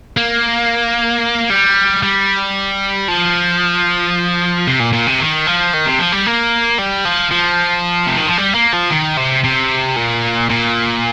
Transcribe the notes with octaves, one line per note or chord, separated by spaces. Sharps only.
A#3
G3
G3
F3
C3
A#2
A#2
C3
D#3
F3
D#3
C3
F3
G3
A#3
G3
F3
F3
C3
D#3
F3
G3
A#3
F3
D#3
C3
C3
A#2
A#2